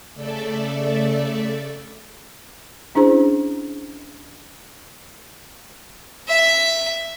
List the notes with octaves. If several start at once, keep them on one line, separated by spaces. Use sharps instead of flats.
C#3 A3 A4 D5 E5
C#4 D4 E4 G#4 C5 A#5
E5